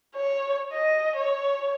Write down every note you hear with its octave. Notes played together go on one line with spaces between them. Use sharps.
C#5
D#5
C#5